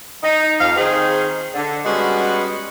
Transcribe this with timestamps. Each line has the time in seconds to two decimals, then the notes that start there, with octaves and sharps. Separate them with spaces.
0.23 D#4
0.60 F2 F5
0.77 D#3 C4 D#4 G#4
1.54 D3
1.85 G3 G#3 B3 C#4 F#4